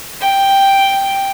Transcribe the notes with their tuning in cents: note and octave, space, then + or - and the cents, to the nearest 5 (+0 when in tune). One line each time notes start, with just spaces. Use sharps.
G5 +0